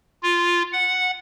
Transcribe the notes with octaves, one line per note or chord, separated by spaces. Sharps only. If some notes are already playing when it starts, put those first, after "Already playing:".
F4
F#5